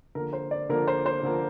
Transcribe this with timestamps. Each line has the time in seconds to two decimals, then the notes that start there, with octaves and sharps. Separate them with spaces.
0.15 D3 F3 A#3 A#4
0.33 C5
0.51 D5
0.69 D3 F3 A#3 A#4
0.88 C5
1.06 C5
1.23 D3 F3 A#3